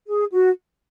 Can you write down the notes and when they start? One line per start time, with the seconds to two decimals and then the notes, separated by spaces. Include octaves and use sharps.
0.07 G#4
0.32 F#4